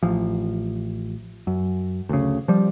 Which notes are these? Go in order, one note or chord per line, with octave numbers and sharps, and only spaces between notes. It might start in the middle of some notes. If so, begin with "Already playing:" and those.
A1 F3
F#2
D2 C#3
F3 G3